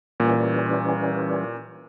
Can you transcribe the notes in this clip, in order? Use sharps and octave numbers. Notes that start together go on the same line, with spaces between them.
A#2 E3 G3 C#4